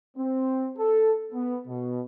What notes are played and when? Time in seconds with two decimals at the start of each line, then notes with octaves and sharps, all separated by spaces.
0.17 C4
0.77 A4
1.33 B3
1.68 B2